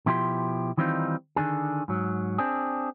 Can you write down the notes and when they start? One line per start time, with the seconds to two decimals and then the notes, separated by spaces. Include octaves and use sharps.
0.06 B2 F3 E4 G4 B5 C6
0.77 D#3 E3 G3 C4 D#4 F4
1.36 D3 D#3 D4 G#4
1.88 G#2 F#3
2.38 C4 D4 G#4